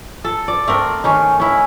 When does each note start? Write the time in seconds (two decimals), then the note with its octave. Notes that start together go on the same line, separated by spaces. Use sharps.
0.24 A4
0.48 D5
0.68 A3 C4 A#4
1.04 D#3 C#4 D#4
1.40 C#4 E4